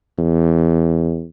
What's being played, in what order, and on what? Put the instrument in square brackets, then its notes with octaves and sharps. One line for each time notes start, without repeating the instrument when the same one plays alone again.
[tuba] E2